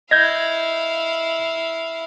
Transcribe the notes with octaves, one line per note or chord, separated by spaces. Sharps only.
E4 D#5 F5 G6 G#6 A#6